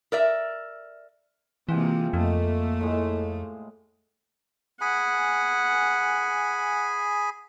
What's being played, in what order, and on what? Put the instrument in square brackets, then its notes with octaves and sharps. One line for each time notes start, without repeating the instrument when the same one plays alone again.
[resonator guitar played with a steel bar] A#4 D5 E5
[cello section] C3 G#3 A#3 [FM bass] E3 [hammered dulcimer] F4 G#4 G5
[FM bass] F2 [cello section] A3 A#3 [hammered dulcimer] A4 D#5 F5
[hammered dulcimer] A2 G#3
[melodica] G#4 G#5 B5 [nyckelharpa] F#5